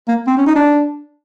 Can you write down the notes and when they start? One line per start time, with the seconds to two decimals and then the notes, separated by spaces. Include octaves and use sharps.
0.08 A#3
0.27 C4
0.37 C#4
0.46 D#4
0.55 D4